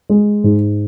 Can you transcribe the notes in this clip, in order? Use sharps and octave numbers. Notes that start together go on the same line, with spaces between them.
G#3
G#2